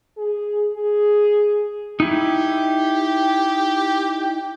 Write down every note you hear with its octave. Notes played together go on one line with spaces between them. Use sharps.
G#4
G#4
D#4 E4 G4